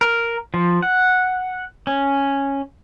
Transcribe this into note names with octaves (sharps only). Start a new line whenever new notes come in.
A#4
F3
F#5
C#4